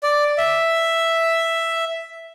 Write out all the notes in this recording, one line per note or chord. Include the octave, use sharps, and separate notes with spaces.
D5
E5